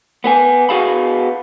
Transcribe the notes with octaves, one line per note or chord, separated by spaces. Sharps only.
B3 B4 G#5
B3 F#4 G#4 F5 B5